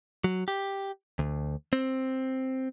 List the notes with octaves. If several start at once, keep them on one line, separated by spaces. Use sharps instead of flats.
F#3
G4
D2
C4